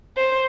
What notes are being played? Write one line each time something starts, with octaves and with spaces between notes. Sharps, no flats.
C5